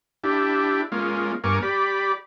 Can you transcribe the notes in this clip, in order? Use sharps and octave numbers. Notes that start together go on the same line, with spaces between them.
D4 E4 G4
G#3 A#3 C#4 F4
G2 A#3 A#4 G#5 C#6 D6
G4 D5 B5